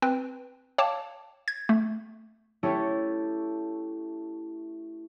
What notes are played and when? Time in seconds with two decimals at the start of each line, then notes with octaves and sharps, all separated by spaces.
0.02 C4 B4 G5
0.78 C#5 F5 G5 A5 D6
1.48 G#6
1.69 A3
2.63 A3 C#4 E4 G4 A4 C#5